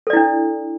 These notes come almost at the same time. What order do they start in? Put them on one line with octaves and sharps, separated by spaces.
A4 D5 E4 D4